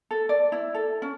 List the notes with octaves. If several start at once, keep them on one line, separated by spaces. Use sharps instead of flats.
A4
D5
E4
A4
C#4